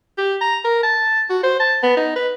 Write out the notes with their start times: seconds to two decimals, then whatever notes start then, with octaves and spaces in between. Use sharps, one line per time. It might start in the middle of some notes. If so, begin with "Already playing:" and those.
0.18 G4
0.41 A#5
0.64 A#4
0.83 A5
1.30 F#4
1.43 C5
1.60 A5
1.83 B3
1.97 D#4
2.16 B4